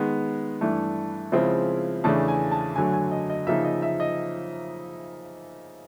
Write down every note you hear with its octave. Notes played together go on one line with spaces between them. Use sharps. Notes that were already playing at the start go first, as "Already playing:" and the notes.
Already playing: D#3 G#3 B3
G2 E3 A3 D4
C#3 F3 G#3 C4 E4
E2 C#3 E3 A3 D4 A5
G#5
A5
F#2 D3 F#3 A3 G#5
G#5
D#5
D#5
C#3 F3 A#3 D#4 E5
D#5
E5
D#5